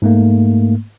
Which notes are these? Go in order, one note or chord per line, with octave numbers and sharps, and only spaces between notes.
G#2 A3 A#3